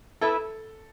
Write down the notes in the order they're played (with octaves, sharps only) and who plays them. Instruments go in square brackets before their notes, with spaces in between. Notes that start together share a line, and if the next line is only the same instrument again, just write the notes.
[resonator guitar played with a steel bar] B3 E4 B4 E5 [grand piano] A4